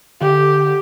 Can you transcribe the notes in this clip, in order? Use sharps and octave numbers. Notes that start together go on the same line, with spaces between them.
D3 G4